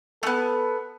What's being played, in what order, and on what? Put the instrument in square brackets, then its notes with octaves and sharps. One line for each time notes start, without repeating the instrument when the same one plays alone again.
[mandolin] A3 B3 [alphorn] A4